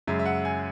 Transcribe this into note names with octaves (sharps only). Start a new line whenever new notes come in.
F#2 C#3 G#3 E5
E5
F#5
G#5